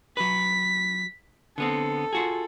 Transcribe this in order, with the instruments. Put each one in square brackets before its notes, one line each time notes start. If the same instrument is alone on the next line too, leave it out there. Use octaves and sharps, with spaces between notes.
[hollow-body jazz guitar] F#3 B4 [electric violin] B6
[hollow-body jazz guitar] D3 B3 C4 [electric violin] A4
[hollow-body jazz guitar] F4 F#4 G#4